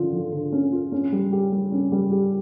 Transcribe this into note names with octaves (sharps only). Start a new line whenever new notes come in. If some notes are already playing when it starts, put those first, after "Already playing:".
Already playing: D3 F3 C#4 F4
F3
D3
C#4
F4
C#4
G3
G4
G3
C#4
G3
G4